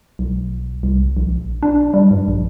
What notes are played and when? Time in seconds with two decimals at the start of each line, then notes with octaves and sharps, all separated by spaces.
0.19 B1
0.83 C2
1.17 A#1
1.63 D4
1.94 G3
2.11 G2
2.28 A#1